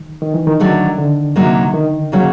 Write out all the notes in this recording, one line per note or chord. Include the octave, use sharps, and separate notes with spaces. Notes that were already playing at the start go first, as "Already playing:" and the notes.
Already playing: D#3
D#3
E3
D#3
D3 F#3 A3
D3
C3 D#3 F#3 A#3
D#3
C#3 F#3 A#3 C#4